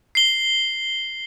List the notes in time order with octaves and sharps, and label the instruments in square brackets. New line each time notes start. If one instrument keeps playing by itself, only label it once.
[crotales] C7 G7